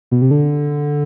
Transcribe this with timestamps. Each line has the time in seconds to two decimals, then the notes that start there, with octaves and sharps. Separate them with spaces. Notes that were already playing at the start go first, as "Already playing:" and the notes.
0.11 B2
0.22 C3
0.31 D3